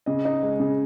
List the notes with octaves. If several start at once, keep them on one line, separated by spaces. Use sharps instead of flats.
C#3 D#5
D#4
G#3
C#3